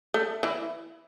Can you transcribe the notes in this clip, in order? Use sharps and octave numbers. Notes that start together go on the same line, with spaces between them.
A3
E3 E4